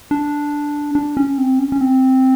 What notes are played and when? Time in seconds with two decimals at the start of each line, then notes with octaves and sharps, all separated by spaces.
0.11 D4
0.95 D4
1.17 C#4
1.38 C4
1.59 C#4
1.72 C#4
1.81 C4